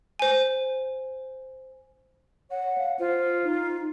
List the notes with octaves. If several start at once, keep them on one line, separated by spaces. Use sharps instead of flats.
C5 G#5
C#5 F#5
F5
F4 C5
D#4